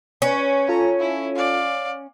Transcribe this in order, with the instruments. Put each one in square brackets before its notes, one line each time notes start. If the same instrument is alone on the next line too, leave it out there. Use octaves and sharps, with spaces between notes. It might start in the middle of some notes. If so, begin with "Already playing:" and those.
[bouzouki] C#4 [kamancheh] B4
[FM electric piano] F4 A4 [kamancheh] A#5
[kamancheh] E4
D5 F5